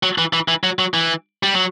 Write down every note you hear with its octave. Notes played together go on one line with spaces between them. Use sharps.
F#3
E3
E3
E3
F#3
F#3
E3
G3
F#3